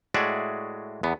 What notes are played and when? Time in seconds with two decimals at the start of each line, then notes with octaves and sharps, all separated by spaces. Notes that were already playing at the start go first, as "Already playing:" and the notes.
0.14 A2 G#3 F#4 G#4 D5 E5
1.03 E2 B3